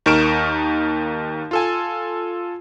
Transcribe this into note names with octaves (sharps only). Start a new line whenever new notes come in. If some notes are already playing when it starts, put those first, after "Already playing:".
D#2 D#4 A#4 C#6 D7 E7
F4 A4 G#5